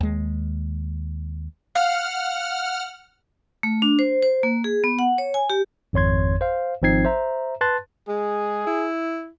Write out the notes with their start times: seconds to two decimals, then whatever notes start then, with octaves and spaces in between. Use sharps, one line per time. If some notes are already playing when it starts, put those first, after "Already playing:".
0.01 D#2 G#3
1.75 F5 F#5 F6
3.63 A3
3.82 D4
3.99 C5
4.23 C5
4.43 A#3
4.64 G#4
4.84 B3
4.99 F#5
5.18 C#5
5.34 G#5
5.50 G4
5.93 G#1 F2 C#5 C6 G#6
6.41 C5 F5
6.82 G#1 F3 C4 D#4 G#6 C7
7.05 C5 E5 A#5
7.61 B4 A5 C6 F#6 A6
8.08 G#3 G#4
8.67 E4